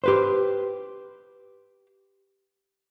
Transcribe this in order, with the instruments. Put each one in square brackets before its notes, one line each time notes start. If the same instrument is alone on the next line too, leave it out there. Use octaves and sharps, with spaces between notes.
[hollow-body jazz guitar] G4 B4 C5